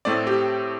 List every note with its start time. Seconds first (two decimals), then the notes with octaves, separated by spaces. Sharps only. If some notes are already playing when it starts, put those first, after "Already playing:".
0.05 A2 A3 C4 D5
0.27 G4